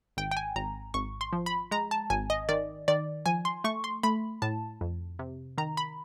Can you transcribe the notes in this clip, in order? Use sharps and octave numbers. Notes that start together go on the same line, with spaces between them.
G#1 G5
G5
G#5
G#1 A#5
G#1 C#6
C6
F3
B5
G#3 A#5
A5
G#1 G#5
D#5
D#3 D5
D#3 D5
F3 G#5
C6
A3 C#6
C6
A3 B5
A2 A5
F2
C3
D#3 A#5
B5